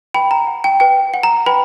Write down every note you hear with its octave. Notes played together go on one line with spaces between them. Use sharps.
B4 G5 B5
A#5
F#5
G5
B4 G5
F#5
A#5
B4 G5 B5